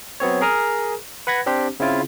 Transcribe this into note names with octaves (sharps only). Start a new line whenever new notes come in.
F#3 B3 C4 C#5
G#4 A#4 A#5 D#6 F6
B4 F#5 B5 G#6 A#6
C4 D4 G4 C5
C#3 C4 E4 F4